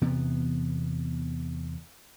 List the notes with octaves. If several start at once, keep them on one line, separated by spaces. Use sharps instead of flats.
E2 C3 B3